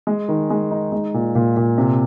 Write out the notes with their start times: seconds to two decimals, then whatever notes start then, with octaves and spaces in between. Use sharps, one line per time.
0.07 G#3
0.29 D#3
0.50 G#3
0.71 D#4
0.92 G#3
1.14 A#2
1.35 A#2
1.57 A#2
1.78 C3